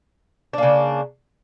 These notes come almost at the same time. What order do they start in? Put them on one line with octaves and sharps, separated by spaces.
D4 A#3 C#3